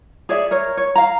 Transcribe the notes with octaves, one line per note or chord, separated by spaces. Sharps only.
G#4 C#5 D5 E5
A#4 C#5
C#5
F5 A#5